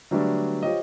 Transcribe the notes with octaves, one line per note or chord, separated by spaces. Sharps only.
D3 F#3 G3 A3 B3 D4
F4 G4 C5 C#5 D#5